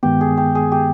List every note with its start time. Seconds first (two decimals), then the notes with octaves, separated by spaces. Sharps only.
0.03 G2 D#3 G#3 B3 G4
0.21 G#4
0.37 G4
0.55 G#4
0.72 G4